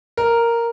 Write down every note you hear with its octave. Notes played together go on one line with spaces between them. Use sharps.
A#4